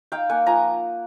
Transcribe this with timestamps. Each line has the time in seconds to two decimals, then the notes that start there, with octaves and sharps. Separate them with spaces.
0.12 D#4 F5 G5
0.29 A#3 F#5 G#5
0.46 F3 G#5 A#5